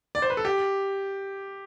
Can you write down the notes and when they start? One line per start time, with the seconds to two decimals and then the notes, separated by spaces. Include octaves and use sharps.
0.15 D5
0.22 C5
0.30 B4
0.37 A4
0.45 G4